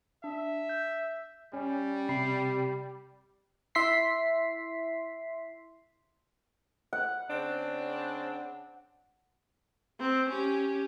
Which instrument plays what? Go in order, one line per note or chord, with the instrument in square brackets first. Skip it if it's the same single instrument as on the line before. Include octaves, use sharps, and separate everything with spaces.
[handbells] D4 [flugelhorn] E5
[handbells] G6
[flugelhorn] G3 [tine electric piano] C#4
[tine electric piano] C3 [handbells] G4 B5 C7
[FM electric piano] E4 E5 C6 B6 C7
[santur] F#5
[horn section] C#3 C4 D4
[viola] C4
C#4 G4